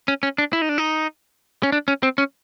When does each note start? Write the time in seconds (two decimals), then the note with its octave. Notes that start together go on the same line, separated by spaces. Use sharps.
0.08 C#4
0.23 C#4
0.38 D4
0.53 E4
0.62 D#4
0.69 D4
0.78 D#4
1.63 C#4
1.72 D4
1.88 C#4
2.03 C4
2.18 C#4